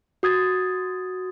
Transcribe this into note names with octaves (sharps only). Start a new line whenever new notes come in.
F#4 D#6 G#6 A6